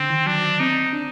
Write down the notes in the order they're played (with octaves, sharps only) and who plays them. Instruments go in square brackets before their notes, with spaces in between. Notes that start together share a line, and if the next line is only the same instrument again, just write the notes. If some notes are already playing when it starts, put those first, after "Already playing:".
Already playing: [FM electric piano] D3 [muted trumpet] C4
[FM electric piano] D#3
[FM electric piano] F#3 [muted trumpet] D4
[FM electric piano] C4 [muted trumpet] D#4
[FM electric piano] D4